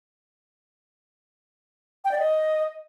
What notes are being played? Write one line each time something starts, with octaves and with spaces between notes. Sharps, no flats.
G5
D5
D#5